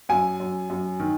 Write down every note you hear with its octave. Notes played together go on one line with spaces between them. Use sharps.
F#2 G#5
F#2
F#2
D#3